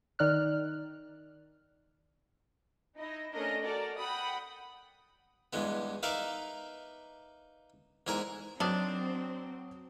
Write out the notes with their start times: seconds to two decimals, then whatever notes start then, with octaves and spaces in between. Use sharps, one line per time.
0.19 D#3 D#4 D5 F6 F#6
2.97 D#4 E4 D#5
3.32 A3 C#4 D4 A#4 D#5
3.64 F#4 A4 A#4 D5
3.99 F#5 G5 B5 D#6
5.53 E2 G2 G#3 B3
6.03 D#4 A#4 B4 D5 E5 F5
8.07 E2 G#2 E4 G#4 A#4 A#5
8.60 D#3 F#3 C4 D4 D#6